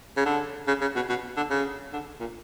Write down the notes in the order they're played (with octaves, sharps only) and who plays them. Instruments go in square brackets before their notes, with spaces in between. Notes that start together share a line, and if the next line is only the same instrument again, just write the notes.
[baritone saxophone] C#3
D3
C#3
C#3
B2
B2
D3
C#3
D3
A#2